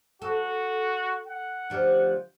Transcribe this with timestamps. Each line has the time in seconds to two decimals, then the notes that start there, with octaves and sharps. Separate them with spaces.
0.22 F#4 A4
1.27 F#5
1.70 D2 F3 G4